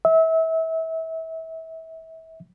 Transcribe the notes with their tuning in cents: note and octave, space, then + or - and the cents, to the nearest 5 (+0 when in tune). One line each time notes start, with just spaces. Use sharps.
E5 -30